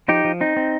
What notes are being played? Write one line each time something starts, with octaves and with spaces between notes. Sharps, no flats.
F3 D#4 G4
F3
C4 D#4
C4